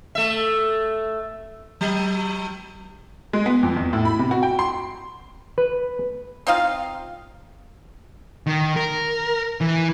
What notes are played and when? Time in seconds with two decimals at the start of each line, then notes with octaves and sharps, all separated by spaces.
0.15 A3 E5
1.81 F#3
3.33 G#3
3.46 B3
3.63 F2
3.76 E2
3.93 A2
4.05 B5
4.19 C3
4.31 F#4
4.43 G5
4.59 C6
5.58 B4
6.47 C4 D#4 F4 F5
8.47 D#3
8.76 A#4
9.61 E3